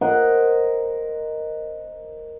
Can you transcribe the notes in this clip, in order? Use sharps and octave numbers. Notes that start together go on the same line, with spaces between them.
A#4 C5 D#5 F#5